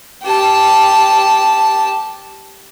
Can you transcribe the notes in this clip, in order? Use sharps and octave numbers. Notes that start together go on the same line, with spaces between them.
G4 A5